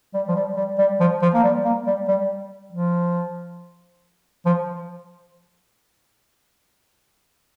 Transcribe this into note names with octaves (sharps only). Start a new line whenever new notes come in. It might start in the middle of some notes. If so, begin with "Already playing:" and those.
G3
F3
G3
G3
G3
F3
F3
A#3
G3
A#3
G3
G3
F3
F3